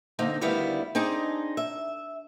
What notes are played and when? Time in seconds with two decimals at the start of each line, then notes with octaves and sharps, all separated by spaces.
0.19 D3 A#3 C4 D#4
0.41 D2 D#3 G3 B3 E4 F5
0.95 C4 D4 D#4 G#4
1.57 E5